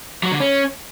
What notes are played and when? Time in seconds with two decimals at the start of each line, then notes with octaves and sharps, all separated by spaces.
0.23 F#3
0.32 D3
0.40 C#4